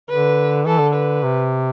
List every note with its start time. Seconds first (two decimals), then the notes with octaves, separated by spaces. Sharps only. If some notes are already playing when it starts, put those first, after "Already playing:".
0.10 D3 B4
0.66 E3 A4
0.80 D3
0.94 B4
1.23 C3